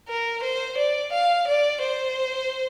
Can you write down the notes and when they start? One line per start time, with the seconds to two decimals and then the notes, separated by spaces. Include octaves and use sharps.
0.08 A#4
0.43 C5
0.78 D5
1.13 F5
1.48 D5
1.82 C5